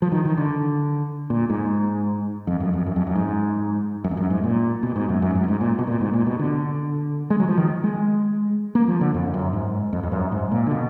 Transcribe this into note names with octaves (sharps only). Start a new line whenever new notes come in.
F3
D#3
D#3
D3
A#2
G#2
F2
F#2
F2
F#2
F2
F#2
G#2
F#2
F2
F#2
G#2
A#2
B2
G#2
F#2
F#2
G#2
F#2
A#2
G#2
A#2
B2
A#2
G#2
A#2
B2
D3
G#3
F#3
F3
D#3
G#3
A#3
F3
D3
F2
F#2
G#2
F2
F2
F#2
G#2
A#2
D3
B2